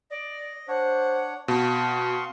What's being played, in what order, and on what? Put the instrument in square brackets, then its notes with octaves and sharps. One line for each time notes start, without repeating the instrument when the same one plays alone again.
[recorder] D5 [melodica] D#5
[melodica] D4 C#5 [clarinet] C5 [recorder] F#5
[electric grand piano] B2 [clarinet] C4 [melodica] F5 C6 C#6 [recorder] A5